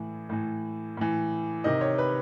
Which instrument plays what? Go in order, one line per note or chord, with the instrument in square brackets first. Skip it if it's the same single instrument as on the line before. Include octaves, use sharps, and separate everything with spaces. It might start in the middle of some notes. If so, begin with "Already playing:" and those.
Already playing: [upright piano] A2 E3
A2 E3
A2 E3
C3 D#3 D#5
C#5
B4